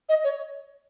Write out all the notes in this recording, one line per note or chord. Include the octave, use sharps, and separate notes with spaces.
D#5
C#5